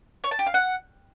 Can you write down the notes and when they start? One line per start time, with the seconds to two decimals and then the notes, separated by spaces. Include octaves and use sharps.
0.24 C#5
0.31 A5
0.39 G4
0.47 F5
0.54 F#5